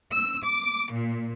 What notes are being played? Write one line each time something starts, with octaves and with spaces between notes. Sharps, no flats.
E6
D6
A#2